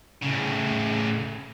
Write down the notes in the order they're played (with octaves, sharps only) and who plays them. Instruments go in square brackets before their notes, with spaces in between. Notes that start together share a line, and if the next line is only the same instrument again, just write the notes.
[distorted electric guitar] A2 C#3